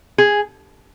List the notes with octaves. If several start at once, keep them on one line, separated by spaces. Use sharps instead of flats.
G#4